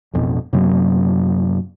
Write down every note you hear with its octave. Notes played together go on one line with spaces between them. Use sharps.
A1 F2 B2
F#2 C3 F#3 A#3